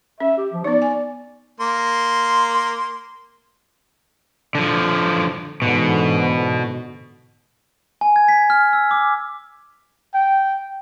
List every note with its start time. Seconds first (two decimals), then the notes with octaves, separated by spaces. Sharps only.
0.20 C#4 E5
0.38 G4
0.53 F3
0.64 B3 D#4 D5
0.82 G#5
1.60 A#3 C6
4.55 D3 F3
5.62 G#2 B2 D3 E3
8.01 G#5
8.16 G#6
8.29 B6
8.50 F6
8.73 E6
8.91 D6
10.14 G5